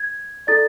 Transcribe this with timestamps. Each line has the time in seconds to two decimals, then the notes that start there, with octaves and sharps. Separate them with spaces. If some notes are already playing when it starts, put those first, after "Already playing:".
Already playing: G#6
0.47 E4 A4 D5 A6